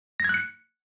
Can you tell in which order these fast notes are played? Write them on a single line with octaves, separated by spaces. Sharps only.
A#6 G#6 F#6 C#7